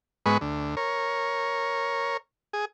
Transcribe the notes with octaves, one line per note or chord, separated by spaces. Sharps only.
G#2 G#3 B3 B4 C#6
D2
A#4 C#5
G#4